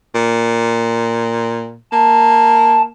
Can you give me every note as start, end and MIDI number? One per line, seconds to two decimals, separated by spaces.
0.15 1.76 46
1.92 2.92 58
1.92 2.82 81